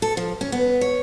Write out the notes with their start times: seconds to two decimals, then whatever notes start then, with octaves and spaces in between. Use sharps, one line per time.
0.02 A4
0.17 F3
0.41 C#4
0.52 B3
0.81 C#5